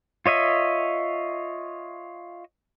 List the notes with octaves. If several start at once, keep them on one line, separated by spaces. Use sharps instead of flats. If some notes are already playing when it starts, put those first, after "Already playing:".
F4 C#5 D#5 E5